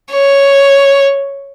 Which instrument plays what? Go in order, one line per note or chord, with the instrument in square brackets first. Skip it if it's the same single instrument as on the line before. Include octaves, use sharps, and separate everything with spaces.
[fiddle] C#5